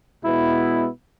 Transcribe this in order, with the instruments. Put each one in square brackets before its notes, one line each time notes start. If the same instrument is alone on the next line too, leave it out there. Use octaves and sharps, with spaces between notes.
[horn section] B2 G#3 B3 E4